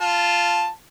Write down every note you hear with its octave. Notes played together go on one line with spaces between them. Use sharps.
F4 A5